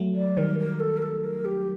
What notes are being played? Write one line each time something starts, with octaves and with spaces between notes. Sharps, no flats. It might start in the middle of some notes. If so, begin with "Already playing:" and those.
Already playing: F#3 A3
D5
D#3 G3 A#4
A#4
A4
A#4
A4
A#4
G4